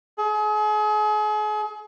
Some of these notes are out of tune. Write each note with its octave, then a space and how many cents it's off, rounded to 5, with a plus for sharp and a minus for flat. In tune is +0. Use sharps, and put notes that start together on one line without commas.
G#4 +35